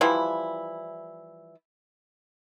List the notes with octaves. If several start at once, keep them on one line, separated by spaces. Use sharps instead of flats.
E3 F3 G3 E4